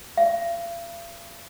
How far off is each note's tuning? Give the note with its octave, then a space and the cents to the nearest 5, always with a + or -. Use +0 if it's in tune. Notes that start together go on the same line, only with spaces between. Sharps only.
F5 -45